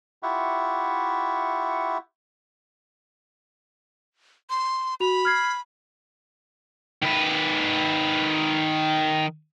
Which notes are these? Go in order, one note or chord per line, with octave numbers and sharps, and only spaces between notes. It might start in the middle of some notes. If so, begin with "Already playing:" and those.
E4 F4 G4 E5 F#5 C#6
C6
F#4 B5 F7
F6 G#6 C7
D#3 B4